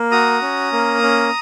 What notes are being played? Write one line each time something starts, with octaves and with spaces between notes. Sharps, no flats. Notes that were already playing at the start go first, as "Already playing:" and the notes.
Already playing: A#3
F#4 A#5 D#6
C#4
A#3
C#4